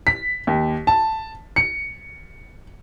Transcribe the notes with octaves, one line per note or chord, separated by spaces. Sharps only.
B6
D#2
A5
C#7